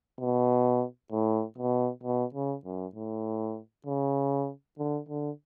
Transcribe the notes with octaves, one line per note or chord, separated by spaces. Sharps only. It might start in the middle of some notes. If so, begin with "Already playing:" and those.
B2
A2
B2
B2
C#3
F#2
A2
C#3
D3
D3